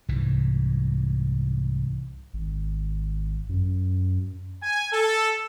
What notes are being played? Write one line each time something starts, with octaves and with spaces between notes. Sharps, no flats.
C2 G#2 E3
G#1
F#2
G#5
A4